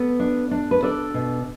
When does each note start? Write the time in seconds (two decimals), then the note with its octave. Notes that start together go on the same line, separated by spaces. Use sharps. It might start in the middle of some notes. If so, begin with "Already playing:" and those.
Already playing: B3 A4
0.20 D4
0.51 D4
0.71 B4
0.83 D4 A4 D5
1.14 B2